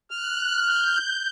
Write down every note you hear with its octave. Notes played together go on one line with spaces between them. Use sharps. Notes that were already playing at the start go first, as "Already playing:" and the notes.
F6 F#6
G6